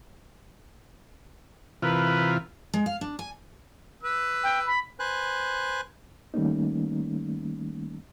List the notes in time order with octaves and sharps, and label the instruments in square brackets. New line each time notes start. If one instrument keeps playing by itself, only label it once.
[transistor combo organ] C3 E3 F4 [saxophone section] A#4 B4
[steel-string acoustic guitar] G#3
F5
D4
G#5
[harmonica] B4 E6
[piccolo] G5
B5
[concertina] B4 C5 G#5 F#6
[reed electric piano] D#3 G3 A3 A#3 C#4 D#4